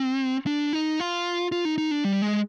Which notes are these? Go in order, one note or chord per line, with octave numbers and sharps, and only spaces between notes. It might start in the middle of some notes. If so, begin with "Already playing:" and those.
Already playing: C4
D4
D#4
F4
F4
D#4
D#4
D4
G3
G#3